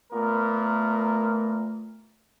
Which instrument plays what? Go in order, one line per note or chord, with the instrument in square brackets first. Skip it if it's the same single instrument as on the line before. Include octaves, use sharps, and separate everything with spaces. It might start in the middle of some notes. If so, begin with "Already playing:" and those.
[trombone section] A#2 B3 A#4 [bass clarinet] A3